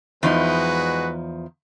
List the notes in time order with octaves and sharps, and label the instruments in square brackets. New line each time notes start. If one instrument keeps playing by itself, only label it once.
[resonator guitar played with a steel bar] E2 F3 D#4 [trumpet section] G#3 F#4 B4